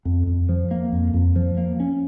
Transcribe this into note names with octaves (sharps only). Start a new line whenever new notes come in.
F2
F2
F3
A#3
F2
F2
F3
A#3
C#4